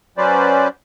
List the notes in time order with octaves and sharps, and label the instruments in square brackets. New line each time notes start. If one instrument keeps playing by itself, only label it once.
[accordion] F#3 C#4 B4 C5 D5